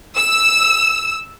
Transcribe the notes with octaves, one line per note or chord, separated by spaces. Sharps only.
E6